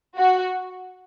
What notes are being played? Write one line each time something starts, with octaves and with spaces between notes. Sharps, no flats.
F#4